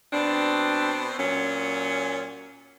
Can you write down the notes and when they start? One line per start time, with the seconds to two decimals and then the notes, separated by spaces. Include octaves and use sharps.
0.13 B2 C4 D4
1.18 A#2 F#3 C#4